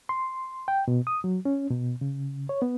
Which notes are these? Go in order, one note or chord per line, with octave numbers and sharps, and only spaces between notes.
C6
G5
B2
D#6
F#3
C#4
B2
C#3
C#5
B3